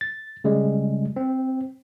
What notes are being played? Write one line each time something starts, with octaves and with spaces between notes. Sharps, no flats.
A6
C#3 G3 G#3
C4